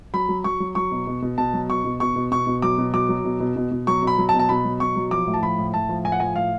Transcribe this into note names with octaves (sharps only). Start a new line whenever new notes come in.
F#3 B5
F#3
F#3 C#6
F#3
F#3 C#6
B2
B2
B2
B2 A5
F#3
B2 C#6
B2
B2 C#6
B2
B2 C#6
B2
F#3 D6
B2
F#3 D6
F#3
B2
B2
B2
B2
F#3 C#6
B2 B5
F#3
A5
B2
A5
B2 B5
F#3
B2 C#6
F#3
F3 D6
A2
A5
F3 B5
A2
A2 A5
F3
A2 G#5
F#5
F3 G#5
A2 F5